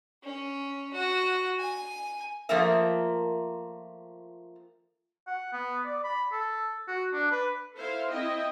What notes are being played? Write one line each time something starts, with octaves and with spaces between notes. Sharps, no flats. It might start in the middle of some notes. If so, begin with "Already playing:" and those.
C#4
F#4
G#5
F3 A3 A#3 C4 A#4 E5
F#5
B3
D5
B5
A4
F#4
D4
B4
E4 A4 C5 F5
C4 E4 D#5 G5